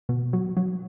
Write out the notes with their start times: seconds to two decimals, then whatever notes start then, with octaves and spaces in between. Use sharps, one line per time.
0.09 B2
0.33 F#3
0.57 F#3